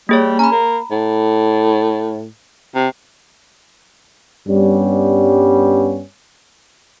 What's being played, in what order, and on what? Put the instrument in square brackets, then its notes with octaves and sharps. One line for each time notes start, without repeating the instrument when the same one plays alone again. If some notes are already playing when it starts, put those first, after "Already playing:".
[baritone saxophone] G3 [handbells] A#3 G#4 C#5
[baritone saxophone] C#4 [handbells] A#5 B5
[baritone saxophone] A#3
A2
C3
[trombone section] G2 G3 B3 C#4